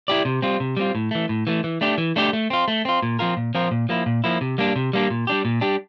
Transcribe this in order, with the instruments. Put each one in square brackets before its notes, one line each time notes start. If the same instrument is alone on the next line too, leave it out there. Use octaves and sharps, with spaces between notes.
[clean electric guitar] E4 G4 D5
C3
G3 C4 F4
C3
G3 C4 F4
A2
E3 A3
A2
E3 A3
E3
A3 D4 G4
E3
A3 D4 G4
A3
C4 F4
A3
C4 F4
A#2
F3 C4 F4 A#4
A#2
F3 C4 F4 A#4
A#2
F3 A#3 E4
A#2
F3 A#3 E4
C3
G3 A#3 D4
C3
G3 A#3 D4
A#2
G3 D4 G4
A#2
G3 D4 G4